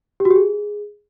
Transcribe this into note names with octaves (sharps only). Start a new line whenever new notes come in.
G4
F#4
G4
G#4